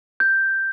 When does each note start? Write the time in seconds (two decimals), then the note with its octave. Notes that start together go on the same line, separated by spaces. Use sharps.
0.20 G6